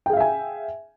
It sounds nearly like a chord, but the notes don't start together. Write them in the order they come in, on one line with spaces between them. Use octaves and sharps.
G5 G#4 F5 E5 G#5